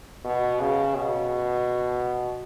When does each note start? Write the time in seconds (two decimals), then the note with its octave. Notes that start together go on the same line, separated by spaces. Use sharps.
0.25 B2
0.60 C#3
0.96 B2